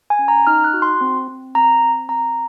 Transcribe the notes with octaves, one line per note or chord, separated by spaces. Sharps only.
G#5
C#4
A#5
D#4 F6
F#6
F#4
C6
C4
C4
C4 A#5
C4
C4 A#5